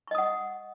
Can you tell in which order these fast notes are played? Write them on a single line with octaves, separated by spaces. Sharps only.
C#6 D#5 D#6 F#5